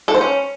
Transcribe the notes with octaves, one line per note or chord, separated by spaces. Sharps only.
A4
C5
C#4